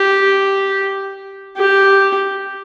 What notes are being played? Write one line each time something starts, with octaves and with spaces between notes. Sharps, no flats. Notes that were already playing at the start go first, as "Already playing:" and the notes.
Already playing: G4
G4